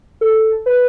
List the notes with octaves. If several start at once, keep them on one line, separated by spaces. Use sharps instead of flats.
A4
B4